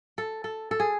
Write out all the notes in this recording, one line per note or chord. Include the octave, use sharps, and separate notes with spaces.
A4
A4
A4
G#4